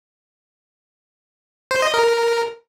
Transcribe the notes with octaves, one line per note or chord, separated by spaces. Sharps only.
C5
D#5
A#4